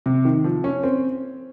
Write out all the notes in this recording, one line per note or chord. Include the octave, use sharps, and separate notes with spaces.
C3
D#3
F3
C#4
C4